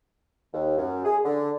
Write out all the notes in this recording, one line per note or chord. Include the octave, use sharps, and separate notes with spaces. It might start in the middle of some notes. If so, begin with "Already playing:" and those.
D#2
F#2
G#4
D3